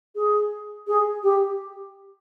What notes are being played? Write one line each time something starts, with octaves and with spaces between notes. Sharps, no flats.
G#4
G#4
G4